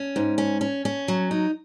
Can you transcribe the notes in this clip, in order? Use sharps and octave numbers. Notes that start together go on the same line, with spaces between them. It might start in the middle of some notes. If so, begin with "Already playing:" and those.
Already playing: C#4
G#2
C#4
C#4
C#4
F#3
D#4